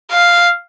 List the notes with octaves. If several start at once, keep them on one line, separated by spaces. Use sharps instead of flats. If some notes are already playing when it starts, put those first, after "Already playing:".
F5